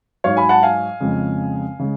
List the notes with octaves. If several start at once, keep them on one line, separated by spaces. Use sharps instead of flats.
G#2 F#3 C#5 F5
G#5 B5
F#5 A5
F5 G#5
F2 C#3 G#3
C#3 G#3